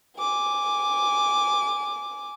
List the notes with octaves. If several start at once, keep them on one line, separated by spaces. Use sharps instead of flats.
G#5 D6